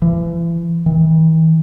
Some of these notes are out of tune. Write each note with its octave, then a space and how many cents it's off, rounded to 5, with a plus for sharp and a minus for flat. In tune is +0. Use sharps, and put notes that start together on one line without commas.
E3 +35
E3 -45